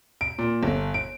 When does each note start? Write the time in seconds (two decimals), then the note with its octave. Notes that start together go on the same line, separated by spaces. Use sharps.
0.21 D7
0.38 A#2
0.63 G1
0.94 D7